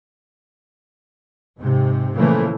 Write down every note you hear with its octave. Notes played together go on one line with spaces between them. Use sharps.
G#2 C3
A#2 C#3 E3 F3 A3 A#3